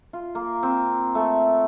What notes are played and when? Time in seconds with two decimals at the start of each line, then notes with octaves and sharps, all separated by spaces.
0.13 F4
0.35 A#3
0.63 C4
1.15 A3